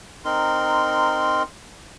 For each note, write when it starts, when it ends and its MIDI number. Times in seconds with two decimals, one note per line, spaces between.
0.25 1.43 60
0.25 1.43 63
0.25 1.43 70
0.25 1.43 84